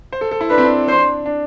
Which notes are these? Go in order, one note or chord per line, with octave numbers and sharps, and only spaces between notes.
C5
A4
A4
E4
D4 B4
C4
D4
C5
D4